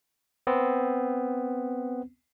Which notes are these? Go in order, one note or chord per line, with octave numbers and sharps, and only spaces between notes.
B3 C4